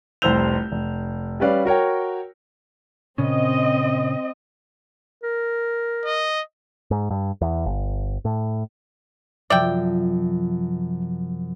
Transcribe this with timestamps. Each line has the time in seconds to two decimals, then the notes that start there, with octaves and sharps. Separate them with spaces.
0.22 F1 C2 C5 E6 G6 F7
0.72 F1
1.40 G3 C#4 B4 D5 F5
1.65 F#4 A#4 C#5 G5
3.18 A#2 C#3 C4 C#4 D#5
5.23 A#4
6.05 D#5
6.91 G#2
7.11 G2
7.41 E2
7.66 G1
8.25 A2
9.50 F#2 C3 F3 D5 E5 G5